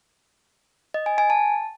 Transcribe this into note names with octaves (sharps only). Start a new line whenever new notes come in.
D#5
G#5
G#5
A5